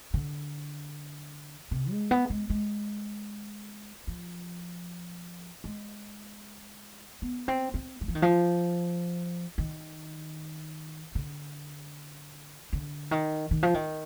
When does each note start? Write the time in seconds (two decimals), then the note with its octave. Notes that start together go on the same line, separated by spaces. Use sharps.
0.14 D3
1.71 C3
1.90 G#3
2.11 B3
2.30 G#3
2.50 G#3
4.07 F3
5.64 G#3
7.22 B3
7.48 C4
7.74 C4
8.01 G3
8.08 F3
8.15 D#3
8.22 F3
9.58 D#3
11.15 D3
12.73 D3
13.11 D#3
13.51 D#3
13.63 F3
13.74 D#3